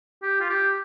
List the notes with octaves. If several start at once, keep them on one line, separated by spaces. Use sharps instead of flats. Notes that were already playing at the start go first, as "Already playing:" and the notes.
G4
F4
G4